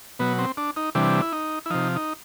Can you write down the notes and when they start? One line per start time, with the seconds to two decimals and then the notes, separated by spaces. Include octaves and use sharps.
0.19 B2 F#3 B3
0.38 C4
0.57 D4
0.76 D#4
0.95 C3 E3 G3 D4
1.22 E4
1.32 D#4
1.66 E4
1.70 C3 F3 D#4
1.96 D#4